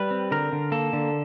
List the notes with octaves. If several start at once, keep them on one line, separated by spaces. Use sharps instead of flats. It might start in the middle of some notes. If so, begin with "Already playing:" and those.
Already playing: G3 B4
C4
D3 A#4
D3
A#3 A4
D3